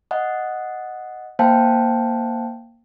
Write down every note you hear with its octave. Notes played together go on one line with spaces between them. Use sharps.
D#5 F#5
A#3 C5 F5 G5 A5